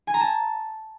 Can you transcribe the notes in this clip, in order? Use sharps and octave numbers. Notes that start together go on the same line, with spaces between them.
G#5
A#5
A5